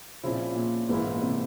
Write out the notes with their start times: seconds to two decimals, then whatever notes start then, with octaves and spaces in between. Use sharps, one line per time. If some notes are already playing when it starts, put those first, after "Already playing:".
0.23 A#2 C#3 F3 C4 E4
0.56 A#2
0.89 G#2 E3 A#3 E4
1.06 A#2
1.22 C3